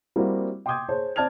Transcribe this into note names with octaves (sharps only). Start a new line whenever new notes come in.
G3 A#3 C4 E4 F#4
G5 C6 D6 D#6 G6 G#6
G#4 C5 C#5 A5
C4 D5 A5 F6 G#6 F7